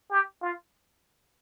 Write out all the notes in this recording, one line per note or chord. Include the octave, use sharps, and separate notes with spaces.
G4
F4